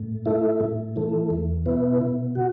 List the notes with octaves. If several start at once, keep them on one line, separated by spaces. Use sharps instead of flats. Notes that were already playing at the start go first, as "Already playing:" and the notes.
Already playing: A2
A3 E4
A2
E3 A3
E2
B2 B3 E4
B2
F#4